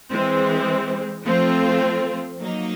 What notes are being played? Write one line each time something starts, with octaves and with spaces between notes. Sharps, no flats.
E3 G#3 C4
F3 A3 C4 F4
F#3 A#3 D#4